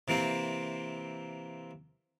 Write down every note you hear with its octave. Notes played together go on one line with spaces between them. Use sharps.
C3 E3 A#3 C4 C5